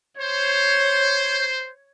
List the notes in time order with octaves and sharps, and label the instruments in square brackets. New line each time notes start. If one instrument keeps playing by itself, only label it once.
[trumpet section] C5 [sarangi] C#5